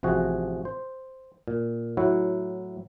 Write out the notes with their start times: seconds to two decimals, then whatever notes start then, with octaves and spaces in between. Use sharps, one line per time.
0.03 A1 C3 F3 F#4 G#4
0.65 C5
1.48 A#2
1.97 A2 F#3 E4 F#4